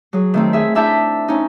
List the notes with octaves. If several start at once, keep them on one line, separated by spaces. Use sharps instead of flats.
F#3 G#4
D#3 A3 C4
G#4 E5
D4 E4 E5 A5 G6
C#4 D#4